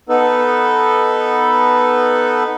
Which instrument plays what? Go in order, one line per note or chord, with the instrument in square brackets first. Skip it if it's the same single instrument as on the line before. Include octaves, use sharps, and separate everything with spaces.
[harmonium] B3 D#4 A4 B4